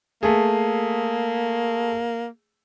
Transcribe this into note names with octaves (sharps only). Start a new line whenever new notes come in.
A3 A#3 G#4